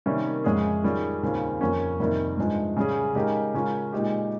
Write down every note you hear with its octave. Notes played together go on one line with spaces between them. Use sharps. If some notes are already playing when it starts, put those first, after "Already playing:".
C3 D#3 G3 A#3 C#4
F2 C#3 G#3 C#4 G#4
D#3 G3 C#4 F4 G#4
D#2 C#3 G3 C4 F4
F2 C#3 F3 A#3 C#4
F2 C3 D#3 G3 A#3
G2 F3 G#3 D#4
C#3 G3 C#4 G#4
C#3 G#3 D#4 G4 A#4
C#3 G#3 C#4 F4 A#4
A#2 G#3 D#4 G4